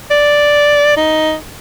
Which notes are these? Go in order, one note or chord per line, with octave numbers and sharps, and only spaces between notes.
D5
D#4